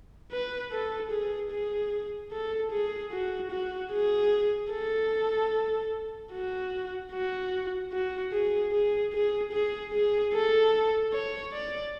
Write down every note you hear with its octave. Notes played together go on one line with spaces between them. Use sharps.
B4
A4
G#4
G#4
A4
G#4
F#4
F#4
G#4
A4
F#4
F#4
F#4
G#4
G#4
G#4
G#4
G#4
A4
C#5
D5